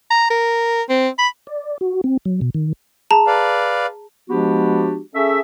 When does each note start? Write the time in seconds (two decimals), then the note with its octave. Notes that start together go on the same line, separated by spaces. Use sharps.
0.11 A#5
0.31 A#4
0.90 C4
1.19 B5
1.47 D5
1.81 F#4
2.04 C4
2.25 F#3
2.41 B2
2.54 D#3
3.11 G#4 A5 A#5
3.27 B4 D5 F5
4.29 F3 G#3 B3 D4 F#4 G4
5.15 C#4 G#4 A4 E5